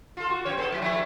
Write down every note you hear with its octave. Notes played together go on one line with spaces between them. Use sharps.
F4 A4
F#4
F#2 C4 C#5
B3 G#4 A4
F#3 G#3 E4
F3 A3 E4